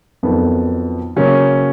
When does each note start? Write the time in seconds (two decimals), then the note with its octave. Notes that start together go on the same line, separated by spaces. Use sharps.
0.23 F2 D#3 F#3 B3
1.16 C#3 F#3 A#3 C#4